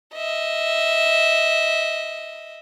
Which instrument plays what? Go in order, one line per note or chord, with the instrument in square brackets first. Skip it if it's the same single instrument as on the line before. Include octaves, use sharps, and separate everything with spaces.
[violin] D#5 E5